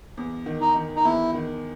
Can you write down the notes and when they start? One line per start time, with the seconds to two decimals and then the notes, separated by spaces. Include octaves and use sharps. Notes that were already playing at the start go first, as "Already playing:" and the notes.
0.17 E2
0.46 D#3
0.61 D#4
0.76 D#3
0.96 D#4
1.04 E2 E4
1.34 D#3